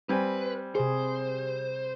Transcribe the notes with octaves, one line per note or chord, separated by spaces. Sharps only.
G3 C4 B4 G#5
C3 G#4 C5